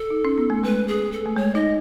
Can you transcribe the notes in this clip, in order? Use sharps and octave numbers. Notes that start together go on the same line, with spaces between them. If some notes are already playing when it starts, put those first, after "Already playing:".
Already playing: A4
D#4
C#4
B3
A3
G#3 B4
G#4
A4
A3
G#3 C#5
D#4 D#5